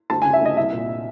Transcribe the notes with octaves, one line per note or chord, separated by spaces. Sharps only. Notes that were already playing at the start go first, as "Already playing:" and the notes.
D2 A5
G#5
C#3
E5
D2 D#5
C2 E5
A#2